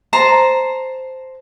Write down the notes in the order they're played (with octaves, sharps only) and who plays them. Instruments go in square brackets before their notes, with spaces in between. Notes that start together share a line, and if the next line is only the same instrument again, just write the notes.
[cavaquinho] C5 A5 A#5